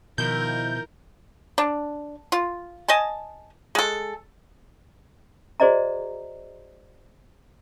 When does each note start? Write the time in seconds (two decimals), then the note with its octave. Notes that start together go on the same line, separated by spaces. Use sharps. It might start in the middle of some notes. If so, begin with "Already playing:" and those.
0.18 B2 D#3 F3 E4 A#4 G6
1.58 D4
2.32 F4
2.88 D#5 G#5 A5
3.75 G#3 A4
5.60 F#4 G#4 C5 D5 D#5 A#5